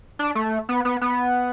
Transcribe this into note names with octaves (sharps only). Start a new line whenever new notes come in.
D4
A3
B3
B3
B3